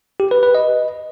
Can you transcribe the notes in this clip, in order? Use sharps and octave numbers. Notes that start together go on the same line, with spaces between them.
G4
B4
B4
D#5